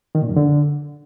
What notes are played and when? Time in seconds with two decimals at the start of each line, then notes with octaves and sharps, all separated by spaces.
0.15 D#3
0.22 A#2
0.29 F#2
0.36 D3